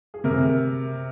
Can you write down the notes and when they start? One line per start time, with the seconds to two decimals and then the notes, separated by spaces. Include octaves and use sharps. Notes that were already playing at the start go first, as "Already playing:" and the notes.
0.14 G#4
0.24 C3 A#4